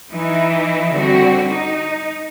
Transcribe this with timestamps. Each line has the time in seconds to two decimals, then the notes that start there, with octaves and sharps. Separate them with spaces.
0.11 E3 D#4 E4
0.93 D3 G3 C4 F#4
1.48 D#4